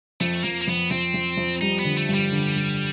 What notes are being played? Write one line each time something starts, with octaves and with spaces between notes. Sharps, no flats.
F2 A3
F2 A#3
A#3
F2 B3
F2 C4
F2
F2
G3 D#4
B3
D3
A3
G2
G3
D3
G2